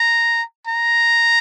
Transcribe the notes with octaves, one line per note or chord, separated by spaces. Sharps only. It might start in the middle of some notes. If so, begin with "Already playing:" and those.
Already playing: A#5
A#5